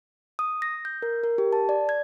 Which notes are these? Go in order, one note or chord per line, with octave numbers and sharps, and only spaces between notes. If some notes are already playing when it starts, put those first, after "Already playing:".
D#6
A#6
G6
A#4
A#4
G4
A5
D5
G#6